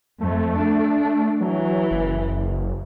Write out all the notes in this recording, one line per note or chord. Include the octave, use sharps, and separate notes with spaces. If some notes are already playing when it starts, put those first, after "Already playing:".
F2 A3
D4
E3 F#3
F#1